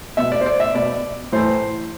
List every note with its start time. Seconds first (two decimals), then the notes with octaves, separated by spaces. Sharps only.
0.17 B2 E5
0.32 D5
0.41 C5
0.46 D5
0.60 E5
0.74 B2 D5
1.32 A2 E3 C5